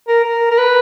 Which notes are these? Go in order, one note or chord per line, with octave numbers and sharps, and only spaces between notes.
A#4
A#4
A#4
B4